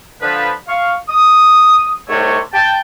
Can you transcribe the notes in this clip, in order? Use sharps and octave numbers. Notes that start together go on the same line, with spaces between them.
D3 F3 B4
F5 C#6
D#6
C2 G#2 C3 A3 C#5
G5 A5